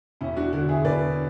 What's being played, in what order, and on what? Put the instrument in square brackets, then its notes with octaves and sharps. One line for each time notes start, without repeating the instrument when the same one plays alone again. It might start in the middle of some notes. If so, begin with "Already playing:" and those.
[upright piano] E1 C#4 E4
D4 F#4
D2 D3 D4 F#4
E4 G#4
E1 B4 D5